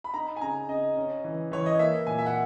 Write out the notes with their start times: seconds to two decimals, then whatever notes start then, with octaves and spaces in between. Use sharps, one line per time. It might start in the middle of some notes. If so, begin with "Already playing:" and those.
0.04 B5
0.14 D#4 A#5
0.36 G#5
0.41 C#3 A#5
0.69 C#3 D#5
0.97 C#4
1.24 E3
1.52 E3 C#5
1.66 D#5
1.79 A#3 E5
2.07 A#2 G#5
2.19 E5
2.26 F#5